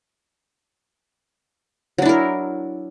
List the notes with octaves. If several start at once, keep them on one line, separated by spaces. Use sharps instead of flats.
F#3 D4 E4 A#4